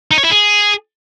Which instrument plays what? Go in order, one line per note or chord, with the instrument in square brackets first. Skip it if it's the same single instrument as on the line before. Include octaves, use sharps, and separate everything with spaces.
[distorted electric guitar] D#4
C#5
E4
G#4